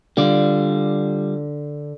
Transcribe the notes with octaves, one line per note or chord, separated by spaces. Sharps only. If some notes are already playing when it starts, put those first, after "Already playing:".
D3 G3 F4 D5